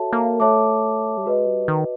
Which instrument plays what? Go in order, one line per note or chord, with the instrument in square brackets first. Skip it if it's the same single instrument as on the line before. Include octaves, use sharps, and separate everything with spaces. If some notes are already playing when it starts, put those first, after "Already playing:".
Already playing: [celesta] F#4 A4 C#5 E5 A5
[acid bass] A#3
[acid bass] A3 [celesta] C#5 E5 A5 D6
[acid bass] G3
[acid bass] G#3 [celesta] F#4 B4 D#5
[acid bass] G3
D#3